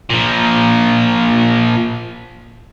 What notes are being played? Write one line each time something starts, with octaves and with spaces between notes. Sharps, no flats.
A#2 F3